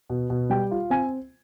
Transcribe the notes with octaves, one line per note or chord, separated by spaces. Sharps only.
B2
B2
G3 G5
F4
C4 G#5